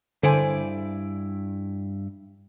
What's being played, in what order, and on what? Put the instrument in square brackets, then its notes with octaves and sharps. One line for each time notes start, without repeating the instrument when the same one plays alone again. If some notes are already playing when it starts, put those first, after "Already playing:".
[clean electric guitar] G2 E4 D5 [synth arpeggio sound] D3 [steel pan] A4 C5 G#5